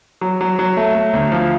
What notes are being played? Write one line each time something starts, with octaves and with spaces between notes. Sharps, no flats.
F#3
F#3
F#3
A3
A3
D2
F3